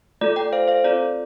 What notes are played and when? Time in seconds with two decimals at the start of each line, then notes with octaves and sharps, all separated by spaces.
0.21 A3 F4 A4 D5
0.36 D5 G5
0.53 C5 F5
0.68 C5 F5
0.84 C4 F4 A4 D5